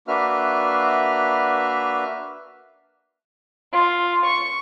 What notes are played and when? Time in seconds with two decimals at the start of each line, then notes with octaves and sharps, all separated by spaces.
0.08 A#3 D4 F#4 B4 E5 F6
3.71 F4
4.25 C#6